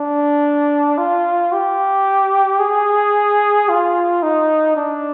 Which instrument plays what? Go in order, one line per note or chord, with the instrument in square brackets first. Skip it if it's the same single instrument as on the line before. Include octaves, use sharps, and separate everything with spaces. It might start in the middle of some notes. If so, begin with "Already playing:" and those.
Already playing: [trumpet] D4
F4
G4
G#4
F4
D#4
D4